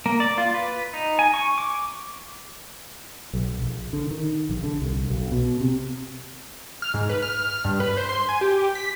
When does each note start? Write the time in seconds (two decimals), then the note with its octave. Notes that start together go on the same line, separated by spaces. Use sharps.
0.06 A#3
0.20 D5
0.38 F4
0.54 B4
0.93 D#4
1.19 G#5
1.34 C#6
1.58 D6
3.33 B1
3.62 A#1
3.93 D3
4.11 D#3
4.49 A#1
4.64 D3
4.82 C2
5.10 B1
5.32 B2
5.61 C3
6.82 F6
6.94 G#2
7.09 B4
7.23 F6
7.65 G2
7.80 B4
7.97 C5
8.09 C6
8.29 G#5
8.41 G4
8.75 B6